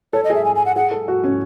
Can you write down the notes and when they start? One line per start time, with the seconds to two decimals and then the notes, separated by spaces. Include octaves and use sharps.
0.13 A4 C#5
0.24 D#5
0.30 G#4
0.35 E5
0.45 G#5
0.56 G#5
0.65 F#5
0.76 G#4 F#5
0.91 A4
1.08 F#4
1.24 C#4